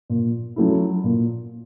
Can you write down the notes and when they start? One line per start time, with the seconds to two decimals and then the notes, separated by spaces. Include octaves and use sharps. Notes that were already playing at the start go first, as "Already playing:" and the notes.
0.10 A#2
0.56 F#3 A3 C#4 E4
1.04 A#2